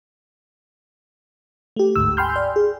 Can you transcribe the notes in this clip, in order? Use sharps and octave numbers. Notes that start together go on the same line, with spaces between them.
A3 G4
G1 D2 G#2 E6
G5 G#5 B5 C6 F6 G6
D5
G#4